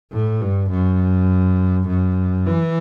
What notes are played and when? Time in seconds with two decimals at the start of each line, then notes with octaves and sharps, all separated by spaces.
0.12 A2
0.41 G2
0.70 F#2
1.88 F#2
2.46 E3